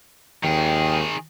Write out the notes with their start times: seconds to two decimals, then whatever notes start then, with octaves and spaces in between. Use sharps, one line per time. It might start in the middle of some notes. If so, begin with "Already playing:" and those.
0.44 D#2 D#3 G#4 G5